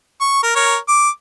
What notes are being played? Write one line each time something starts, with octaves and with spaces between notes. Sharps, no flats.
C#6
A#4
A#4 C#5
D6